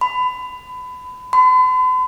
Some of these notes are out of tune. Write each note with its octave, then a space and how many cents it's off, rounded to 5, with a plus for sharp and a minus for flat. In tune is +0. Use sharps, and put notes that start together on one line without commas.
B5 +25
B5 +45